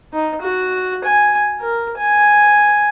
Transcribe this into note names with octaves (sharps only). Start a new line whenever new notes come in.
D#4
F#4
G#5
A#4
G#5